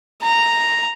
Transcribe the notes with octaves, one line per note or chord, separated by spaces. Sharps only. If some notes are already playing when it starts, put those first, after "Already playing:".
A#5